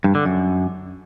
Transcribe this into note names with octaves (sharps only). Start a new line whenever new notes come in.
G2
D3
F#2